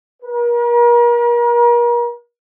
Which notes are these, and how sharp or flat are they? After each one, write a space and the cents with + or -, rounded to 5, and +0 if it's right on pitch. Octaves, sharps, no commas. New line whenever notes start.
A#4 +40